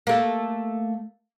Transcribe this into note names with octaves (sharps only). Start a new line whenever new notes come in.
A3 A#3